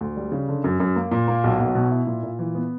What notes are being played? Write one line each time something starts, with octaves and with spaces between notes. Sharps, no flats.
D2
G3
C#3
D3
F#2
F#2
A#3
A#2
A#3
B1
B1
B2
E4
A#2
A#2
E3
B3